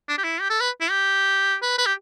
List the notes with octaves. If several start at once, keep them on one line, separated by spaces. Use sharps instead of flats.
D4
G4
E4
G4
A4
B4
E4
G4
B4
B4
G4